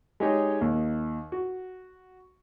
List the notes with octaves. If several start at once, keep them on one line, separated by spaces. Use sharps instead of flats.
G#3 D#4 G4 G#4 C#5
D#2
F#4